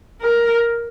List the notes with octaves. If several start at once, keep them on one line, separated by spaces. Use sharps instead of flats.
A#4